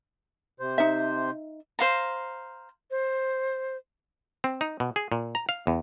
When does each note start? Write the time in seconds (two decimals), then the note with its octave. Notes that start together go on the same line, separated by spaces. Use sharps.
0.60 C3 C5
0.78 D#4 E5
1.79 C5 F5 A#5
2.91 C5
4.44 C4
4.61 D#4
4.80 B2
4.96 G#4
5.12 A#2
5.35 A#5
5.49 F5
5.67 E2